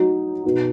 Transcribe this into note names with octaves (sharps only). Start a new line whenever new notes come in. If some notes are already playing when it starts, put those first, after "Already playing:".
Already playing: F#3 D#4 F#4
B2 B3 D#4 F#4